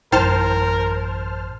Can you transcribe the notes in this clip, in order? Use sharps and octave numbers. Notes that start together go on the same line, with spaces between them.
A1 F#2 E4 A#4 C5 G5 A5 F6